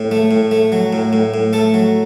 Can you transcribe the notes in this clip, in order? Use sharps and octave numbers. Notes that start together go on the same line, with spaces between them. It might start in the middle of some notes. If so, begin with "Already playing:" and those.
Already playing: A2
A3
A2
A3
F#3
A2
A2
A2
A3 A4
F#3